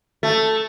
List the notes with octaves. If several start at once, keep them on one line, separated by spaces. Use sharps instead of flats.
A3